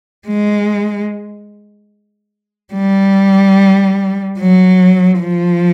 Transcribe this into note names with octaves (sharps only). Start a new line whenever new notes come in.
G#3
G3
F#3
F3